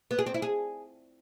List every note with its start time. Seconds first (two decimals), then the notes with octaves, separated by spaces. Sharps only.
0.11 B3
0.19 G#4
0.26 C4
0.34 E4
0.42 G#4